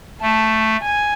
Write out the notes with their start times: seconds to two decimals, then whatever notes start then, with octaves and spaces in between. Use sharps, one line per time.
0.21 A3 A5
0.82 G#5